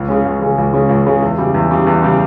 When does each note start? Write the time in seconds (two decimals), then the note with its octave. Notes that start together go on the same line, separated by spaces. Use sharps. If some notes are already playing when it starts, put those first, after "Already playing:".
Already playing: C#2
0.08 C#3 G#3 C#4
0.25 C#2
0.41 C#3 G#3 C#4
0.58 C#2
0.73 C#3 G#3 C#4
0.89 C#2
1.06 C#3 G#3 C#4
1.22 E2
1.38 C#3 G3
1.54 E2
1.71 C#3 G3
1.87 E2
2.02 C#3 G3